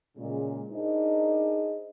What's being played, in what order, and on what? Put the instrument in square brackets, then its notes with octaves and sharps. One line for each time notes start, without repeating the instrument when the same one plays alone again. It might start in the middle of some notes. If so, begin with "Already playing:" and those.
[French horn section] A#2 C#3 G#3
D4 D#4 G#4 A#4 C5 D#5